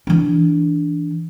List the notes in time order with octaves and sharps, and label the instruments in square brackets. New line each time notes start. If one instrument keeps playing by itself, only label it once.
[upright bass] E3 D4